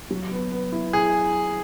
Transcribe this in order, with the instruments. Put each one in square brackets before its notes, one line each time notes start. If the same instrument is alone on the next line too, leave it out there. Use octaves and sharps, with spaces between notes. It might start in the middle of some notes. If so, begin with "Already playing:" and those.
[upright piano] F#3
B3
B3
E4
[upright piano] E4 [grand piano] G#4